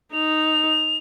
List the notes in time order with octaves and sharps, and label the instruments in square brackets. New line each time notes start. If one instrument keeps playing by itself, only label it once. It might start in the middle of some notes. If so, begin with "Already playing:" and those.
[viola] D#4 [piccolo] F7